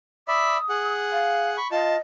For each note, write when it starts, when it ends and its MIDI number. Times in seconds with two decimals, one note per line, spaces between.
0.28 0.57 74
0.28 0.57 76
0.28 0.57 83
0.28 0.94 87
0.69 1.57 68
0.69 1.57 78
1.12 1.50 77
1.57 1.68 83
1.57 1.68 85
1.72 1.96 65
1.72 1.97 75
1.72 1.96 81